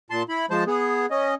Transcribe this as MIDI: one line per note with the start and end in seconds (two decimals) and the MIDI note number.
0.11 0.23 46
0.11 0.23 81
0.11 0.23 84
0.29 0.46 64
0.29 0.46 83
0.50 0.64 53
0.50 0.64 56
0.50 0.64 72
0.50 0.64 81
0.67 1.06 59
0.67 1.06 68
1.11 1.35 61
1.11 1.35 75